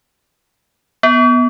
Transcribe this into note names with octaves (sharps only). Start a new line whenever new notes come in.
B3